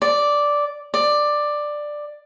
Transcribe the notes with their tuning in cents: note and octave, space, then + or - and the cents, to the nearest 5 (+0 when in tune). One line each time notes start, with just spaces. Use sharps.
D5 -5
D5 +10